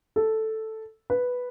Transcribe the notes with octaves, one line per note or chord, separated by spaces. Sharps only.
A4
B4